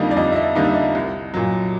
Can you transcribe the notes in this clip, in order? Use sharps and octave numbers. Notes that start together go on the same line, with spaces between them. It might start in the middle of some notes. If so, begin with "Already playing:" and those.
Already playing: F2 D3 G3 A#3 D#4 D#5
D5
F2 D#5
E5
D#5
D3 G3 A#3 D#4
E5
D#5
C2
A#2 F#3